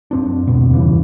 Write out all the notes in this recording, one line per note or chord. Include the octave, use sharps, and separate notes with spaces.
F#2 C4 D4
E1 D2 B2
E2 G2 C#3 E3